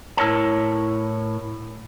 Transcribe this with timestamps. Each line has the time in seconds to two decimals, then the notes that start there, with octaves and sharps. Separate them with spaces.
0.17 A2 E4 A#4 C#5 A5